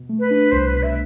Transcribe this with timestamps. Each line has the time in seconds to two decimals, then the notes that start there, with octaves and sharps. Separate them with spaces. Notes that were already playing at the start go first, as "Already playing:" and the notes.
Already playing: B2
0.09 A3
0.19 B4
0.31 D4
0.51 C2 C5
0.67 B4
0.73 B2
0.83 E5